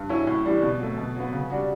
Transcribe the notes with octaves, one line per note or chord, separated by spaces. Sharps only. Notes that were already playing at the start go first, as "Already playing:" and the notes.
Already playing: G2
F#3 C#4 E4
A2
E3 G3 D4
B2
F#3 A3
B2
F#3 B3
C#3
G3 D4 F#4